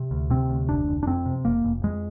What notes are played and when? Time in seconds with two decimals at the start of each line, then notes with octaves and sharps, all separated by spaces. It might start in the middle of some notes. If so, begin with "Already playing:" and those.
Already playing: C3
0.11 D2
0.30 C3 C4
0.50 D2
0.69 F1 D4
0.89 F1
1.03 D4
1.07 F2 C4
1.26 C3
1.45 F1 A#3
1.64 F1
1.83 F2 G#3